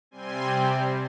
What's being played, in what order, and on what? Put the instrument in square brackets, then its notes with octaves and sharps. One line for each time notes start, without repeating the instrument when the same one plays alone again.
[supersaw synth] C3 G3 C4 G#5 C6